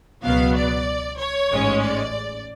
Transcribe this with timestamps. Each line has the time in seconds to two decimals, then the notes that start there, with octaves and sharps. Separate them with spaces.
0.24 C#2 B2 F#3 B3 F5
0.55 D5
1.19 C#5
1.50 A1 G#2 G#3 C#4
1.82 D5